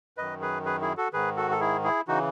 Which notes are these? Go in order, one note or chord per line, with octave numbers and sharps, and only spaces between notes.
F#2 D#3 B4 D#5
G#4 B4
G#4 B4
E4 G#4
F#4 A4
G#2 D#3 G#4 B4
F#4 A4
A4
E4 G#4
E4 G#4
C#3 E3 D#4 F#4